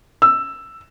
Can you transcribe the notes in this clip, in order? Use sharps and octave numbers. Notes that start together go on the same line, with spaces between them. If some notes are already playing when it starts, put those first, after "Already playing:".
E6